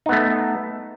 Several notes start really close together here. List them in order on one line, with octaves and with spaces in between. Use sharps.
D#4 B3 A3